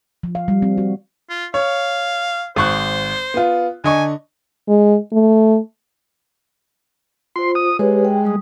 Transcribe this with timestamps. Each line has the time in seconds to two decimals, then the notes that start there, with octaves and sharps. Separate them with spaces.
0.23 F3
0.35 F5
0.48 G3
0.62 C4
0.78 F#4
1.29 F4
1.54 C#5 F5
2.56 G#1 C5 C#6 F#6
3.34 B3 F4
3.84 D3 D#5 G#5 C#6
4.68 G#3
5.12 A3
7.36 F4 C5 C6
7.55 D#6
7.79 G#3 G4 B4 C#5
8.05 G5
8.25 G3 D#6